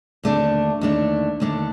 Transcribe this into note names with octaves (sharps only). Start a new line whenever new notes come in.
D#2 D3 A3 D4
D#2 D3 A3 D4
D#2 D3 A3 D4